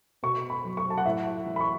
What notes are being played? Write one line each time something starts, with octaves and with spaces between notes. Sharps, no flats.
B2 C#6
B5
F#3
C#6
A5
F#5
A2 E5
E3
B5
C#6